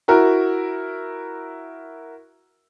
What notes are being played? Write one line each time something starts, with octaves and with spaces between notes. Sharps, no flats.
E4 F#4 A#4